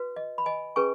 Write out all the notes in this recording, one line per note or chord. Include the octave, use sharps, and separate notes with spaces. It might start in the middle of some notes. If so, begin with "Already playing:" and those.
Already playing: F#4 B4
D#5
B5
D#5 G#5
C#4 G#4 B4 G#5 C#6